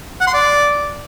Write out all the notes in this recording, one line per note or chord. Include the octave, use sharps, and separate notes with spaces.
F#5
C6
D5